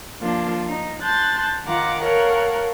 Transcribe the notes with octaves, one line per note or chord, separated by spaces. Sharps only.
F3 A#3 D4 F4
D#4
A5 C6 F#6 G6 A6
D#3 F4 F5 F#5 A#5 D6
A4 A#4 C#5 F5 F#5